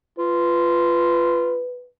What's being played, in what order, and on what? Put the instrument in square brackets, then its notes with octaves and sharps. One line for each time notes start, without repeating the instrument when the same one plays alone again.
[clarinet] F4 [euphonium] B4